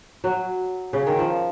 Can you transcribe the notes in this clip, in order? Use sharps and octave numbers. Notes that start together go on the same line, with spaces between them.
F#3
C#3
D#3
F3